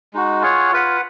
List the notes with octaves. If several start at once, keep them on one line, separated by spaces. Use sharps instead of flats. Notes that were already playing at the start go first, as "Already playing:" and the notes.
G#3 D#4 F#4
F4 G#4 C#5 F#5
F4 B4 F#5